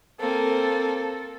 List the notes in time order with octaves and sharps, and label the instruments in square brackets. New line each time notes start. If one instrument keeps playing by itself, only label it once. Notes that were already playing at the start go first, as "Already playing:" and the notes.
[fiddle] A#3 C4 [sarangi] A4